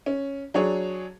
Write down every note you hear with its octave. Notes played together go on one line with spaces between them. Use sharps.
C#4
F#3 D4 G#4 C#5